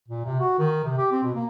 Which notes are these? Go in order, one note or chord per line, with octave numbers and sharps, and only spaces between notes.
A#2
C3
F#4
D#3
C3
G4
C4
B2
A#3